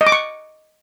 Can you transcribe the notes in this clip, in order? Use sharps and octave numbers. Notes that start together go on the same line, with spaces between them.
D#5
D6
C#6